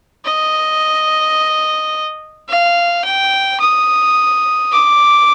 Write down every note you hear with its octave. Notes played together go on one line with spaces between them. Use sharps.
D#5
F5
G5
D#6
D6